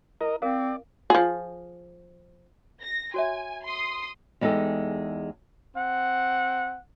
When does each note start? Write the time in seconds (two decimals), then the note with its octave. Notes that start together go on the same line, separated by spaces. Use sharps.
0.21 E4 A#4 D#5
0.42 C4 A#4 D5 F5
1.10 F3 G#4
2.82 A#6
3.14 F#4 C#5 E5 G#5
3.64 C6 D#6
4.41 E2 G#3 D#4 G4 A4
5.75 C4 F#5